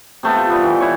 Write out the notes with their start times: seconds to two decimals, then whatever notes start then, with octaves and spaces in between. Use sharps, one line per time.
0.23 C3 A3 B3
0.36 F4
0.50 G3 B3
0.63 E3
0.80 E4 C#5